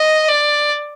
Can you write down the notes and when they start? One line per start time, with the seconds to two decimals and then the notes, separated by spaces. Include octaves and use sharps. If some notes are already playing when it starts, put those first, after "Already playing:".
Already playing: D#5
0.28 D5